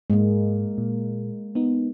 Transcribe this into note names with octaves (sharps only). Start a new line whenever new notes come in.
G#2 G#3 A#3
A#2
B3 D#4